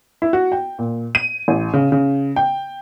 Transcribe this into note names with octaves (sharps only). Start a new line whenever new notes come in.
E4
F#4
G5
A#2
D#7
A1
C#3
C#3
G5